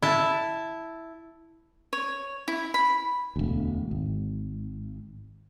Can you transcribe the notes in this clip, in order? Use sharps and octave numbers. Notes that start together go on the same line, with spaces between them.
E4 A5
C#5
E4
B5
E1 D2
G#1